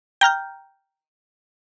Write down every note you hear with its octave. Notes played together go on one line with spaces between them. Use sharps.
G5 A#5 F6 G6